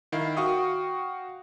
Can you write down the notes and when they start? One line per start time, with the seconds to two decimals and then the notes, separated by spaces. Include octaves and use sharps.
0.12 D#3 E4 F5 C7
0.37 F#4 F5 G5 C#6 D#6